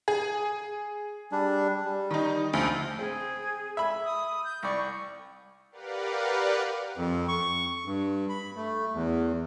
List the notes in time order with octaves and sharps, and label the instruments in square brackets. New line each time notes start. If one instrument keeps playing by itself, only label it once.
[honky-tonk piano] G#4
[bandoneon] G3 D4
G3
[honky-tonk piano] D#3 D#4
[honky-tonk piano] D2 [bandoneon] F3
[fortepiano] C4 [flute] G#4
[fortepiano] E5 B5
[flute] D#6
G6
[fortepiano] C2 D5 [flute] C#6
[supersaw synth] G4 A#4 B4 D5 F5 F#5
[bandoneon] F2
C#6
G2
B5
A3
E2